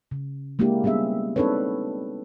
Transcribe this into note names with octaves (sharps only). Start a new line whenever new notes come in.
C#3
G#3 A#3 D4 E4 G4
G3 B3 C#4 G#4 E5
C4 D4 D#4 A4 B4 C#5